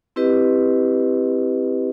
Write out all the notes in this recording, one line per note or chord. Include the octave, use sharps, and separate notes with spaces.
C4 E4 G4 B4 D#5